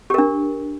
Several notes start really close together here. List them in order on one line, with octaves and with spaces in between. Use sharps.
G4 A#4 D4